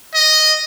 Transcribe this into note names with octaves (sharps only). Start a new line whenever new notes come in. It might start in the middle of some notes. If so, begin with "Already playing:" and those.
D#5